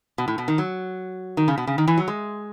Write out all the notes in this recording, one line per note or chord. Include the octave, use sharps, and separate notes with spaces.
B2
A2
B2
D#3
F#3
D#3
C#3
B2
C#3
D#3
E3
F#3
G#3